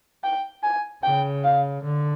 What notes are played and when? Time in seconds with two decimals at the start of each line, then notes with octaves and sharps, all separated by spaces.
0.24 G5
0.63 G#5
1.03 C#3 G5
1.44 F5
1.83 D3